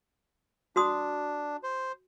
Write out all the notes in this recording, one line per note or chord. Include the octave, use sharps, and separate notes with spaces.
D4 F#4 C6 D#6
C5